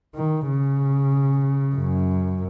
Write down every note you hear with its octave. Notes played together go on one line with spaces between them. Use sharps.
D#3
C#3
F#2